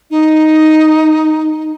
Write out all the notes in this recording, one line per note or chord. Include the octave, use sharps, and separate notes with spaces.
D#4